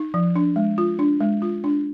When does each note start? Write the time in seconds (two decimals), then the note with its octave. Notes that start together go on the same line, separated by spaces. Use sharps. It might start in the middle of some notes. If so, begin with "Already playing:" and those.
Already playing: D#4
0.14 F3
0.36 D4
0.56 G#3
0.78 F4
0.99 D4
1.20 G#3
1.42 F4
1.64 D4